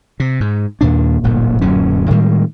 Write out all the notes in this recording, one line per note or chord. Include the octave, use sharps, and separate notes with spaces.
C3
G#2
D#2 A#2 D4
D1 G1 G2 A#2
D1 F#2 A#2 C#4
A2 D#3 G3 G#3